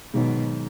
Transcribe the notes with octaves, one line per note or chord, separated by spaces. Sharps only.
G#2 B2 D#3 F#3